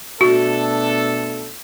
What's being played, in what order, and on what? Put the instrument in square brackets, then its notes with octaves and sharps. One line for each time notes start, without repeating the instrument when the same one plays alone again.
[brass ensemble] B2 A3 D4 A4 [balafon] F#4